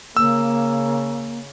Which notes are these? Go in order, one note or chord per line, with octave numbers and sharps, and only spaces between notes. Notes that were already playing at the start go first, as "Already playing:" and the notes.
C#3 A#3 E6